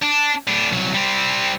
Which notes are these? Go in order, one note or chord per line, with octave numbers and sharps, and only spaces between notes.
D4
A2 D4
C2 F#3
G3 C4